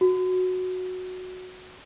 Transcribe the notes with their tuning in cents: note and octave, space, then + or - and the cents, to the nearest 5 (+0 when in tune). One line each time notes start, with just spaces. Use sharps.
F#4 -10